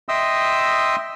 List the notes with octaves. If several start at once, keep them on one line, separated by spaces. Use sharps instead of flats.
D#5 E5 G5 C6 D#6 E6